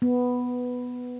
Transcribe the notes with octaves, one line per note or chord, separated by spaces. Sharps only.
B3